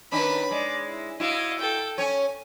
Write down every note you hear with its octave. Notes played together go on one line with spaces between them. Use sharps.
D#3 C#4 D4 B4 B5
G#3 D5
E4
E4 F#4 D#5 F5
A4 G5
C#4 C#5 G#5